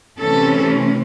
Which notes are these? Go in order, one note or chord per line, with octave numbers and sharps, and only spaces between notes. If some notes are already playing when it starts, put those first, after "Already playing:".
C3 E3 A3 C#4 A4